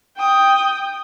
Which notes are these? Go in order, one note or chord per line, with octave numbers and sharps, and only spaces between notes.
G5 D#6